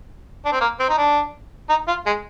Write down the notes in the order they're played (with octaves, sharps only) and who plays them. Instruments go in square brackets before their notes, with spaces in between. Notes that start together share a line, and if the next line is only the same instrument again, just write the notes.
[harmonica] D4
C4
A#3
C4
D#4
D4
D#4
F4
G#3